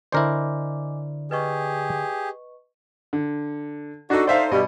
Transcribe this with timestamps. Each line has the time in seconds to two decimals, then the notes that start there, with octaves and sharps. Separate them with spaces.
0.12 D3 E4 A#4 C5 D5 D#5 G#5 D6
1.31 G4 G#4 B4 D#5 C#6
3.13 D3
4.10 D4 D#4 F#4 A4
4.27 D#4 A4 C5 D5 E5 F5
4.51 G2 B2 G3 D#5